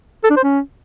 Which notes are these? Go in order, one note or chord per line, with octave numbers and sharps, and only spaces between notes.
A4
D4
C5
C#4